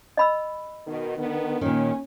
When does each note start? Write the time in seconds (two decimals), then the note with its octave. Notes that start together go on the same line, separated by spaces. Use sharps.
0.17 D#5 B5 E6
0.86 B2 D#3
1.18 D3 D#3 B3
1.61 A#2 D#3 C#4